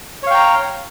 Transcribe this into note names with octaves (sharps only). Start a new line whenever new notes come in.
C#5 F5 G5 A#5